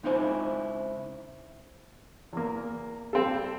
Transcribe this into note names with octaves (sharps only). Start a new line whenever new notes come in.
C#2 C4 D#4 E4 C5 G#5
E2 A#3
G3 C4 A4